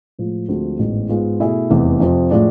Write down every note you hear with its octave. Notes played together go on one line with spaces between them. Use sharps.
A2 F3 G#3
D2 D3 F3 G#3 C4
A1 G#2 E3 G#3 B3
G#2 G#3 B3 F4
B2 A3 E4 G#4
F1 E2 C3 E3
F2 C3 F3
A2 F3 G#3 D4